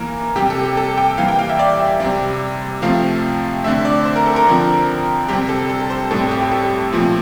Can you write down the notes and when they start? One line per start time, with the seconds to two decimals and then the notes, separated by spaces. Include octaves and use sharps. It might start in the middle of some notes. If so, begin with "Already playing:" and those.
Already playing: E3 A#3 A#4
0.36 C3 G3 C4 G4
0.50 A4
0.63 G4
0.77 A4
0.98 G5
1.18 E3 G3 A#3 F5
1.28 G5
1.39 F5
1.49 E5
1.59 D5
1.79 E5
2.00 C3 G3 C4 D5
2.82 C3 F3 A3 C4 F5
3.64 D3 A3 C4 E5
3.85 D5
4.05 C5
4.16 A#4
4.26 A4
4.36 A#4
4.46 D3 F3 C4
5.28 C3 G3 C4 G4
5.49 A4
5.70 A4
5.80 A4
5.90 C5
6.11 A2 G3 C4 A4
6.31 G4
6.42 G4
6.52 A4
6.93 A#2 F3 A3 C4